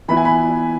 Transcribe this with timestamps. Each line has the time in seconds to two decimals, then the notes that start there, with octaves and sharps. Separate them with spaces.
0.08 E3 B3 E4 B5
0.17 G#5
0.25 B5